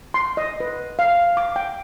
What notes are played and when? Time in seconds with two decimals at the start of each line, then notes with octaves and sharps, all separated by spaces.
0.14 C6
0.37 D#5
0.60 B4
0.99 F5
1.37 D6
1.56 G5